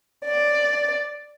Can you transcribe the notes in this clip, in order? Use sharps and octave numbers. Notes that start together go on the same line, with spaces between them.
D5